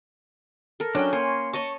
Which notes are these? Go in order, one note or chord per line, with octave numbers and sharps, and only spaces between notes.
A4 A#4
F#3 C#4 D4 G5
A#3 C#5 G#5 C6
C#5 D#5 A5 C#6